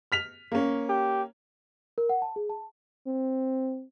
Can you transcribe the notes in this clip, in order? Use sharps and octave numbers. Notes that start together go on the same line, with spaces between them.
F6 B6 F7
A#3 C#4
G4
A#4
F#5
A5
G#4
A5
C4